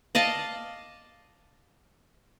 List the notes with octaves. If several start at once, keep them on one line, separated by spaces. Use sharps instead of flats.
D5 D#5 F5 A5